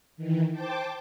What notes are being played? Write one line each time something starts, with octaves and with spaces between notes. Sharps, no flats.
D#3 E3
C5 G5 A5 D6